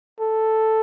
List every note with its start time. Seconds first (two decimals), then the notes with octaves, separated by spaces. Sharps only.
0.20 A4